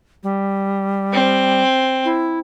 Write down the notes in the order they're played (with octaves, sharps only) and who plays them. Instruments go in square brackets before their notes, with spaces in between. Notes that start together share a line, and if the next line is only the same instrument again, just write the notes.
[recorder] G3
[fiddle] C4
[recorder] E4